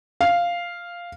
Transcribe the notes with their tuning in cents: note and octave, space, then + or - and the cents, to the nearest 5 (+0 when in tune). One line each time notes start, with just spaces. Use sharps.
F5 -5